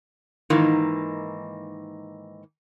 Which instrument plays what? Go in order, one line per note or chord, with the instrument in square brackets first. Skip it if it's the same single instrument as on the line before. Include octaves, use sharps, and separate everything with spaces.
[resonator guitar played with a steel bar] G#2 D#3 E3 A#3 D#4